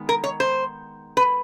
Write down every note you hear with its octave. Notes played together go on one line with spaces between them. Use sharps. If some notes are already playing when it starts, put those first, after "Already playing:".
Already playing: D#3 G#3 B3
A#4
C#5
C5
B4